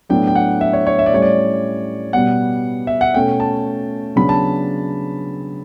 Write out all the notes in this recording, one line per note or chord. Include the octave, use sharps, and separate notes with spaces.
A2 F#3 B3 D4 G5
G5
F#5
E5
C#5
C#5
E5
D5
A2 G3 C#4 C#5
D5
B2 G3 B3 F#5
E5
F#5
B2 A3 C#4 G5
A5
C#3 F#3 B3 D4 B5
A5